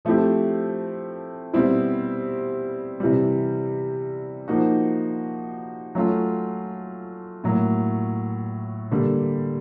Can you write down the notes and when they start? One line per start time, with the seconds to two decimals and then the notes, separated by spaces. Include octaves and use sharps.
0.05 F3 A3 C4 E4 G4
1.53 B2 G3 C4 E4
3.00 C3 E3 G3
4.48 F3 A#3 D#4 F#4
5.95 F#3 A3 C#4 F4
7.44 A2 F#3 A#3
8.91 D3 G3 A#3